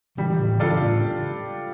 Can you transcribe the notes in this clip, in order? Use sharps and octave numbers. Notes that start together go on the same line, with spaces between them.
C#3 E3 G3
D3
A2 C#3
C#3 E3 D4 F4 A4
A#2
A2 C#3